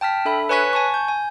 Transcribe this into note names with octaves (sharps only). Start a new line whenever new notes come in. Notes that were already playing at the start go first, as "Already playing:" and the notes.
G5 A5 F6 B6
D4 A4 E5 B5
B4 C#5 G#5 C#6 F#6 B6
G#5 A5 C#6
G6
G#5